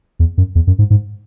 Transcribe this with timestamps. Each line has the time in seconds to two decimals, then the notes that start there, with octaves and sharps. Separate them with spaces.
0.19 E2
0.37 F#2
0.55 E2
0.67 F#2
0.79 G#2
0.90 G#2